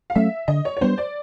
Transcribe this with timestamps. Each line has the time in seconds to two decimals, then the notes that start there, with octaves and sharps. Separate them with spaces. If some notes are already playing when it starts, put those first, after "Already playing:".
0.10 F5
0.15 F#3 A3 C#4 E5
0.48 D3 D#5
0.65 C#5
0.77 C#5
0.81 G3 B3 D4 C5
0.98 D5